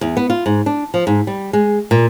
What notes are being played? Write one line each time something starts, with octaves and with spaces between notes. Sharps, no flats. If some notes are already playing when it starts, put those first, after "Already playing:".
E2
B3
F4
G#2
D4
F3
G#2
G3
G#3
A#2